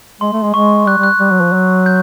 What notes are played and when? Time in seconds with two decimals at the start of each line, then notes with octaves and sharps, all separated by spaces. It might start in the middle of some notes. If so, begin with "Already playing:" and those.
0.21 G#3 C6
0.33 A3
0.43 G#3
0.54 G#3 C#6
0.86 G3 F#6
0.98 G3
1.03 F#6
1.20 G3
1.31 F#3
1.41 F3
1.53 F#3
1.86 G6